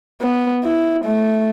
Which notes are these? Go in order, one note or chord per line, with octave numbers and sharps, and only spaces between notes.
B3
E4
A3